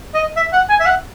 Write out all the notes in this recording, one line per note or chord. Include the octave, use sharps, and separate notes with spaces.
D#5
E5
F#5
G#5
E5
F#5